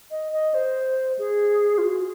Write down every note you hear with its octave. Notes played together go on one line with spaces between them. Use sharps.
D#5
D#5
C5
G#4
F4
F#4